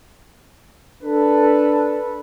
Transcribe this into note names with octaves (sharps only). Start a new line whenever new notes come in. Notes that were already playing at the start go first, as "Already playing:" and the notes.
D4 A4 B4